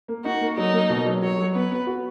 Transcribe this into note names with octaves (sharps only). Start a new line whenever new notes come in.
A#3
D#4 F#4
A#3
F#3 D#4
A#3
B2
F#3
F#3 C#5
F#3
B3 B4
B3
F#4